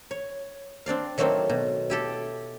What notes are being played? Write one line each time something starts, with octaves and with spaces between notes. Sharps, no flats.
C#5
C4 D4 D5 F5
D#3 F#3 A3 A#3 C4
B2
E4 G4 A4